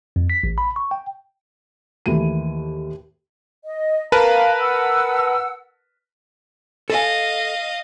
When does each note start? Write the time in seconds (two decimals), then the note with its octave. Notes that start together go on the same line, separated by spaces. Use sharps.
0.16 F2
0.30 B6
0.44 A1
0.58 B5
0.76 C#6
0.91 G5
2.06 D#2 E3 A3 D#7
3.65 D#5
4.12 A#4 B4 F5 A5 A#5
4.60 F#5 E6
6.90 A4 D#5 F5 G#5